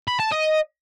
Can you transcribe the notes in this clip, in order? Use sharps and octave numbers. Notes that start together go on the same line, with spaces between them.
B5
A5
D#5